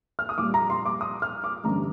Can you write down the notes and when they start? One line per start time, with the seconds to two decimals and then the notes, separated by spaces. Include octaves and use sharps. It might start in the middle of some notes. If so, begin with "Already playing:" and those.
0.19 F6
0.29 D#6
0.38 A#1 A#2 G3 D6
0.54 A#5
0.70 C6
0.86 D6
1.01 D#6
1.22 F6
1.44 D6
1.64 A1 G2 D3 A3 A#5